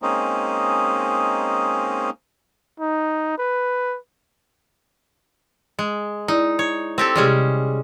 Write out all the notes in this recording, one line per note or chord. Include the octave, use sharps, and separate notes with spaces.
G#3 A#3 C4 C#4 D#4
D#4
B4
G#3
D#4 E4 D5
C#5
C4 G4 A4
C3 G3 G#3 C#4 G4 G#4